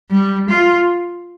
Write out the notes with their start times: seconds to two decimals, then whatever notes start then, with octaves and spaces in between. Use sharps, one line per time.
0.10 G3
0.49 F4